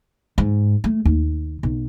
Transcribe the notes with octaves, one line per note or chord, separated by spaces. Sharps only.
G#2
A3
D#2
B1